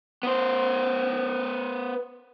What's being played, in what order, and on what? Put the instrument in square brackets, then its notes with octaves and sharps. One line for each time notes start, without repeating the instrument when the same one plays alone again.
[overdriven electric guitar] B3 C5